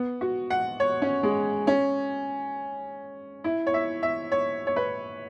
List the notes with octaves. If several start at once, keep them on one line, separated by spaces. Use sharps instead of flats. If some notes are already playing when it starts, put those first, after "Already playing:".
Already playing: B3
F#4
F#5
C#5
C#4
G#3
C#4
E4
C#5
E5
E5
C#5
C#5
B4